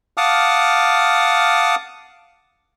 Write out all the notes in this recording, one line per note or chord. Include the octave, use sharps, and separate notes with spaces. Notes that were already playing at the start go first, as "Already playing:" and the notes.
F5 F#5 A5 D6 D#6 F6